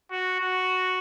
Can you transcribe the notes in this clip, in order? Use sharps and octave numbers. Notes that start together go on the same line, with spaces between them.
F#4
F#4